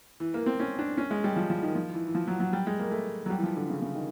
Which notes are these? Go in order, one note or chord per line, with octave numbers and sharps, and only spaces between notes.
E3
A#3
C4
C#4
D4
C#4
G#3
G3
F3
F3
D#3
F3
E3
E3
F3
F#3
F#3
G3
G#3
A#3
A3
F#3
G3
E3
F3
D3
C#3
C#3
D#3